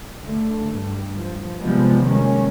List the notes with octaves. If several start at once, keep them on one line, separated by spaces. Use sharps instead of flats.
D3 A3
G2
F3
C3 F3 G3 G#3 B3
D#3 G#3 A#3 C#4